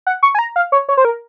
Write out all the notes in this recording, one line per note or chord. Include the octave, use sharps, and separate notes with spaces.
F#5
C#6
G#5
A#5
F5
C#5
C#5
C5
A#4